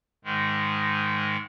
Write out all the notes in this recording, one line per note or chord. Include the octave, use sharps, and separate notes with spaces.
G#2 D#3 G#3